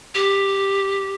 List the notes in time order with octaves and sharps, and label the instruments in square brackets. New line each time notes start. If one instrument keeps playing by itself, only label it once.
[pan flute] G4